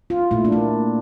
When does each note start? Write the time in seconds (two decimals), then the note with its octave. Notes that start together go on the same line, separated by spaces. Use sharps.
0.10 F4
0.31 A#2 A3 E4
0.45 D4
0.52 A#3